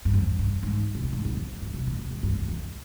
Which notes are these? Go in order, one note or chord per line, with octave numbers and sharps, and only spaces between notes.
G2
F2
G2
G#2
C3
A#2
G#2
F2
F2
G#2
C3
A#2
C3
G#2
G2
F2
F2